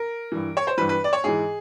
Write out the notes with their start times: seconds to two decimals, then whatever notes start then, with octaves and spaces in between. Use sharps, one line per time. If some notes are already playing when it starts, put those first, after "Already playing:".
Already playing: A#4
0.32 G2 E3
0.57 C#5
0.67 C5
0.77 E3 B4
0.81 G2
0.89 B4
1.04 D5
1.13 C#5
1.24 G#2 E3 G#4